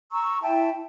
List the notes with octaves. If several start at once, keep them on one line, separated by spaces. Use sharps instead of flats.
A#5 C#6 E6
E4 E5 G5 A5